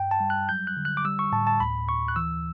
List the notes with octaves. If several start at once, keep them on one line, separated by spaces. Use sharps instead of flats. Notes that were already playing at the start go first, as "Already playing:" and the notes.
Already playing: G2 G5
A5
G3
F#6
F#3 G6
F#6
D3
F#6
D6
G3 E6
C#6
A2 A5
A5
D2 B5
D2 C#6
F#6
E3 E6